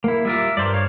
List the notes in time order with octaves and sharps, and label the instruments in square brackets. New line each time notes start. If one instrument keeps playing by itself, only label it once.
[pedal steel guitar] A#3 E4
[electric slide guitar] G3 F4 A#4 [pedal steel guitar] E5
[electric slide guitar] G2 [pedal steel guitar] A#4 C5 D5
[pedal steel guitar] C#5 F5